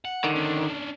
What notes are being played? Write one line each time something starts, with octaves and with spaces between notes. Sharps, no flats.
F#5
D3 D#3
C#4 D4